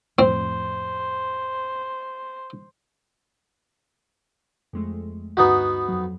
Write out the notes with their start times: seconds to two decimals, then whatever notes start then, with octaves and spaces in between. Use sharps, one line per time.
0.19 F2 A2 C4 C5
4.73 F2 G#3 A3
5.37 D2 G2 B3 D#4 F#4
5.88 F2 F#3